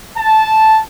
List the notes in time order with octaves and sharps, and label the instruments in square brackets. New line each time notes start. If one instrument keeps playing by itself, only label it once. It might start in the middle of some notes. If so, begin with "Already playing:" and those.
[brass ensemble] A5